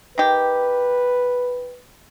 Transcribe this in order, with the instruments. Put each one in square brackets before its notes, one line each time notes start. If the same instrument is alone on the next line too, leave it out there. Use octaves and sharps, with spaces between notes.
[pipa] D#3 G4 [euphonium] B4